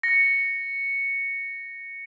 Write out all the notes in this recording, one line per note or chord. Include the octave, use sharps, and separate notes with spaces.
A#6 C#7